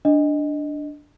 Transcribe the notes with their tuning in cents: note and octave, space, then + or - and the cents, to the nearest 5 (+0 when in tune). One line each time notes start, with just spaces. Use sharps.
D4 +0 D#5 +0